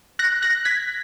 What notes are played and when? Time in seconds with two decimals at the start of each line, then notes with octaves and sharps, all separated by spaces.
0.19 F#6 A#6
0.42 F#6 A#6
0.65 G#6 B6